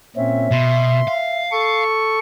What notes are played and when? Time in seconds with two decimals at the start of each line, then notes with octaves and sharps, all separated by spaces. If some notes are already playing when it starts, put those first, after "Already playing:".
0.16 A#2 C4 C#4 E5
0.52 B2 C6
1.07 F5
1.52 A4 C#6